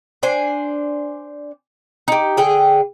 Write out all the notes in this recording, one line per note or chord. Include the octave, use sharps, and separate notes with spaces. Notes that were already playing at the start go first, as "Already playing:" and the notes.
D4 C5 G#5
D#4 G4
D3 G#4 G5